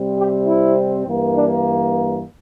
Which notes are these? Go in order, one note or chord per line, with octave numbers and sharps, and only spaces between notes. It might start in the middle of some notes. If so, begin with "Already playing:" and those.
Already playing: C3 G3 C4
G4
E4
G2 E3 A#3
D4